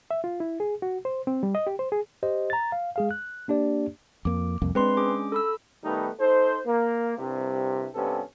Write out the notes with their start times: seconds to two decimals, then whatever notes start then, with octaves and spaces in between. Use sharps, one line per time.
0.11 E5
0.24 F4
0.40 E4
0.60 G#4
0.82 F#4
1.05 C5
1.27 C4
1.43 G3
1.55 D#5
1.67 G4
1.79 C5
1.92 G#4
2.23 G4 C5 D#5
2.50 A#5 A6
2.72 F5
2.96 G#3 G#4 F5
3.11 F#6
3.48 A#3 D4 G4 D5
4.25 F2 A#3 D6
4.62 C2 F2 A#3
4.75 G#3 C4 D4 B4 C6
4.97 C#4 G#4 D6
5.32 A4 B5 E6
5.84 D#3 G3 A3 B3 D#4
6.20 D#4 A4 C5
6.67 A#3
7.18 C2 G2 C3
7.95 G2 C3 B3 C#4 A4